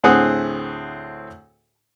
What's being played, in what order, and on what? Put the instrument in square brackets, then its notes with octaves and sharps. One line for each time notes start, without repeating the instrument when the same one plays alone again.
[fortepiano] D2 A2 C4 G#4 F#5 D#6